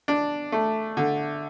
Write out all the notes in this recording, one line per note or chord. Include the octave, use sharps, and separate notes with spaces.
D4
A3
D3